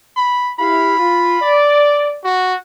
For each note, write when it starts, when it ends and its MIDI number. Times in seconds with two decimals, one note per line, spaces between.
0.17 0.53 83
0.59 0.96 64
0.59 0.96 67
0.59 0.96 77
0.59 1.60 83
0.99 1.36 65
1.42 2.18 74
2.24 2.56 66